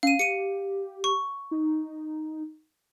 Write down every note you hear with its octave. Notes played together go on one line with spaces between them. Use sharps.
C#4 F5 D#7
G4 C#7 D#7
C#6
D#4